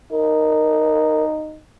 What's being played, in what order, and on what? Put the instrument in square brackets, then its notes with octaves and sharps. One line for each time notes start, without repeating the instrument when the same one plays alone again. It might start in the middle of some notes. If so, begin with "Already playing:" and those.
[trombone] D#4 [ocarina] A#4